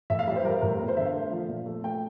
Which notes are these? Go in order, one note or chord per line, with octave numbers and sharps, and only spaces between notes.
A2 E5
F5
G3 E5
C5
G3 A#4
A2 A#4
E2 A#4
C5
D3 E5
F5
A3
F3
A#2
A3
A3 G5